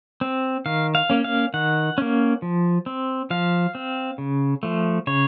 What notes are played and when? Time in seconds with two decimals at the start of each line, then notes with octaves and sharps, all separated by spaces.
0.21 C4
0.66 D#3 F5
0.95 F5
1.10 A#3 C#4
1.24 F5
1.54 D#3 F#5
1.98 A#3 C#4
2.42 F3
2.86 C4
3.30 F3 F5
3.75 C4
4.18 C#3
4.63 F3 A3
5.07 C#3 C#5